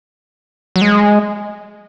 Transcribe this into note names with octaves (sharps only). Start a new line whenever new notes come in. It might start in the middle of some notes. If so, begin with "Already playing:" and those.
F#3
G#3